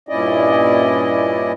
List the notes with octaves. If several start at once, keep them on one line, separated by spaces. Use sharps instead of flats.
G2 A#2 C#4 E4 D5 D#5